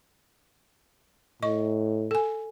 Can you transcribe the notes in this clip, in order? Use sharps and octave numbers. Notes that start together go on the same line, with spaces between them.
A2 D#5 C#6
A4 G#5